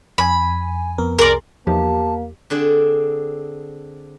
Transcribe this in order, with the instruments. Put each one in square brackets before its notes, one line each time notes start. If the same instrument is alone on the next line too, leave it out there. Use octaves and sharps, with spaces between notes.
[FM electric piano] F2 G#5 [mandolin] B5
[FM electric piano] F2 B3 A#4
[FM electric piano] C2 G#4 C6 [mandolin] A#4 D5
[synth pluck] E2 F3 D#4 [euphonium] A#3 [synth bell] G4 [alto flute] A5
[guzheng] D3 C4 D4 G#4 D5